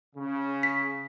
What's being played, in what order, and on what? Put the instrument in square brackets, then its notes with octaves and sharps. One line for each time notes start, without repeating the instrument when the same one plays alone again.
[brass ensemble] C#3
[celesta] B6